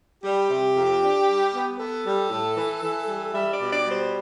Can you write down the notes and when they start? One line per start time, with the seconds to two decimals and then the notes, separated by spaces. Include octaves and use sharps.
0.23 G3 G4
0.49 C3
0.74 F2
1.01 D4
1.26 G3
1.52 B3
1.78 B3 A4
2.05 G3
2.30 A2
2.56 E3
2.82 E3
3.07 G3
3.33 G3 E5
3.52 D5
3.60 B2
3.72 D5
3.85 G3
3.91 C5